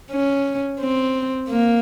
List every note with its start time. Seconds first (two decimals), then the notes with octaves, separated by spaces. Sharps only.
0.11 C#4
0.80 C4
1.49 A#3